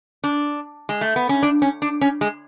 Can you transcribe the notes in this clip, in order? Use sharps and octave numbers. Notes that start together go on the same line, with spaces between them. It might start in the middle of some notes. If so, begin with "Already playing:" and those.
D4
G#3
A3
B3
C#4
D4
C#4
D4
C#4
G#3